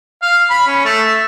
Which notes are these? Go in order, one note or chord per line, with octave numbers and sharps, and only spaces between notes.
F5
B5
C#4
A3
E5